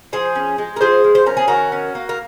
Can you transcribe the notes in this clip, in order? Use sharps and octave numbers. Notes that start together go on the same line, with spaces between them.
F3 G#4 C5
C#4
G#3
A#4
F3 G#4 C5
F3
C5
C#4 A#4
G#4
D#3 F#4 A#4
C#4
A#3
A#4